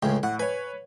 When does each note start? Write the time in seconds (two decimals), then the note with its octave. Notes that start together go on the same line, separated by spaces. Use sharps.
0.03 C#2 A2 C#3 G5
0.23 A2 F#5
0.40 B4 C#5 G#5